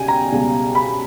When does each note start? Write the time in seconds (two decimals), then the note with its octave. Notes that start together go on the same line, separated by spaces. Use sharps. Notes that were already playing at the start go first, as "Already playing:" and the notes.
Already playing: C#2 B2 G3 G5 G#5
0.08 A#5
0.31 C#2 B2 G3
0.75 B5